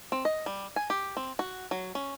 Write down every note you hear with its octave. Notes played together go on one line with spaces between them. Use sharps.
C4
D#5
G3
G#5
G4
C4
F#4
F#3
C#4